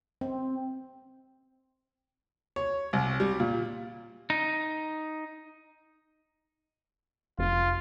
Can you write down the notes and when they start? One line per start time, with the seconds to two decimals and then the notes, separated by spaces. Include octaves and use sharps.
0.21 C4
2.56 C#5
2.93 C2
3.20 G3
3.40 A#2
4.30 D#4
7.39 F1 F4